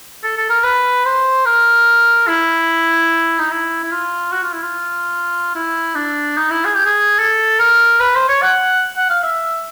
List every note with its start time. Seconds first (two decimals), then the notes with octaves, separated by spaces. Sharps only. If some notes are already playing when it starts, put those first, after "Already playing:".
0.23 A4
0.37 A4
0.50 A#4
0.64 B4
1.05 C5
1.45 A#4
2.28 E4
3.39 D#4
3.51 E4
3.83 E4
3.92 F4
4.32 F#4
4.43 F4
4.53 E4
4.63 F4
5.55 E4
5.95 D4
6.37 D#4
6.50 E4
6.65 G#4
6.75 G4
6.86 G#4
7.19 A4
7.59 A#4
8.00 B4
8.15 C5
8.28 C#5
8.42 F#5
8.97 F#5
9.09 F5
9.23 E5